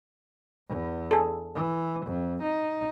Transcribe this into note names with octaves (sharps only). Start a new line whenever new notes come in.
E2
G#4 A4
E3
F2
D#4